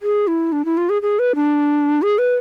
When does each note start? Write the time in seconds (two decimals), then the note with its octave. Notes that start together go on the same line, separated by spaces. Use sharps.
0.02 G#4
0.27 E4
0.52 D4
0.65 E4
0.77 F4
0.89 G#4
1.02 G#4
1.19 B4
1.35 D4
2.02 G#4
2.18 B4